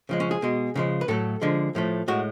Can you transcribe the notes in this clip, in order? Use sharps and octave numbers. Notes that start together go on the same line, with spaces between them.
C#3 F3 G#3
C#4
G#4
B2 G#3
C#3 F3 G#3
B4
A2 F#3 A3 A4
D3 F3 G#3
A2 F3 A3
A2 G#3 F#4